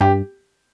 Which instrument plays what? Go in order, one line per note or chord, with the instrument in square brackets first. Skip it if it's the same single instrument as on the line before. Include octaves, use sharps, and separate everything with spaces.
[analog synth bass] G2 [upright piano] G4